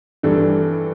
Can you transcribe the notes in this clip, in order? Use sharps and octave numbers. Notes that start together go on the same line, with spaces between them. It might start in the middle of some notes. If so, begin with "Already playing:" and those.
G2 E3 G3 D4 A4